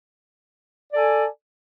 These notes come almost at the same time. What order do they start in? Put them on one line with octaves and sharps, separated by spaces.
D5 A4 G#5